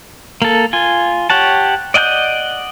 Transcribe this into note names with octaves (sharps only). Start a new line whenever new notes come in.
A#3 A4
F4 G#5
G4 C#5 F#5 A5
D5 D#5 F#5 G#5 G6